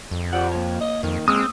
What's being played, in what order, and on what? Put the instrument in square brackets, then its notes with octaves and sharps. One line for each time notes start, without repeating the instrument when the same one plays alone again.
[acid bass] F2
[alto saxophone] F3 [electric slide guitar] G4 D5 F#5
[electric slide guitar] A#3 C#5
[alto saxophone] D#5
[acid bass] F2 [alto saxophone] D#3
[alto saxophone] G#3 [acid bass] C4 [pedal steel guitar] D#6 E6